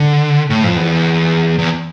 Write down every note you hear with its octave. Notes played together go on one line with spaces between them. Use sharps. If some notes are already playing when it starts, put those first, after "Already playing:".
Already playing: D3
A2
F2
E2
E2